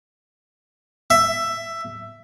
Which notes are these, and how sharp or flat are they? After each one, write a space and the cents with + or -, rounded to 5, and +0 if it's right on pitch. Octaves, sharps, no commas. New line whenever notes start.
E5 +10